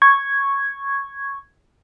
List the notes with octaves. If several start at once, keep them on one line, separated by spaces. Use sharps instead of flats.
C#6 G#6